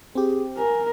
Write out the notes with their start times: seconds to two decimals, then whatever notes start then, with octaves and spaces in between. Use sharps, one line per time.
0.15 C4 G4 G#4
0.57 A#4 G#5